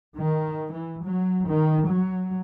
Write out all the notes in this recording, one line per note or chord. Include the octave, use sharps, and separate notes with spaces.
D#3
E3
F#3
D#3
F#3